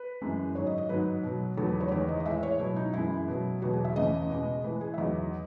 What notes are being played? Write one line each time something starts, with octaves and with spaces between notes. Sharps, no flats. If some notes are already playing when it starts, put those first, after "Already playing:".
Already playing: B4
F#2 E3 G#3
G#2 D#3 F#3 C#5
D#5
D#5
G#2 D#3 F#3 B4
B2 F#3
E2 D#3 F#3 A4
B4
C#5
E2 D#3 G#3 C#5
D#5
D#5
A2 E3 G#3 E5
C#5
B2 F#3 E4
D#4
F#2 E3 G#3 E4
B2 F#3
E2 B2 F#3 F#4
G#4
E5
E2 C#3 E3 D#5
B2 G#3
A2 E3 G#3 B4
G#4
E5
E2 D#3 F#3 D#5